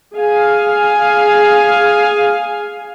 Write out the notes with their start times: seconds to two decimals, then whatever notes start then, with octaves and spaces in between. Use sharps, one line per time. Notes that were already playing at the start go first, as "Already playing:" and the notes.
0.14 G#4 F5 G#5